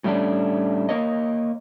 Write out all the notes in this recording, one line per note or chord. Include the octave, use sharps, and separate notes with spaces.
A2 G3 A3 C#4 D4
A#3 A#4 C#5 D#5